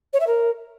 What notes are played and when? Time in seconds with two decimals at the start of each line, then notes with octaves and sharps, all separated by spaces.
0.13 C#5
0.20 E5
0.26 A#4